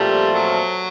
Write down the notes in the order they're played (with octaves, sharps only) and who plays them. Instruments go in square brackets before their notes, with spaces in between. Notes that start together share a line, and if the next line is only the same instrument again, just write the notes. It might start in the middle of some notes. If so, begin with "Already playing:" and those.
Already playing: [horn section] A#2 F3 A3 C4 F4 [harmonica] G3
[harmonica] F#3